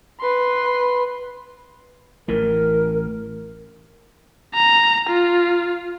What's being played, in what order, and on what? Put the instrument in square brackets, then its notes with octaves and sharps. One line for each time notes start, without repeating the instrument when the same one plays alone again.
[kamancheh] B4 C6
[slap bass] A1 A2 E3 [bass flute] A#4
[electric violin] A#5
F4